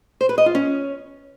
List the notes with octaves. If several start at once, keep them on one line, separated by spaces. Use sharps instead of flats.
C5
B4
D#5
F4
C#4